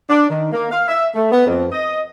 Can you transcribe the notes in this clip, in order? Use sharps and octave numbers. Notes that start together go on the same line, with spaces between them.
D4
D#3
A#3
F5
E5
A3
B3
F2
D#5